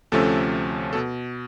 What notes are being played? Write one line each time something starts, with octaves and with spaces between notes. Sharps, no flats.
D2 C3 F3 A3 C#4 A4
B2 A4